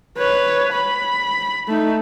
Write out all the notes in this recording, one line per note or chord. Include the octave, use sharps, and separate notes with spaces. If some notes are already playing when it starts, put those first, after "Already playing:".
B4 C#5
B5
A3 D#4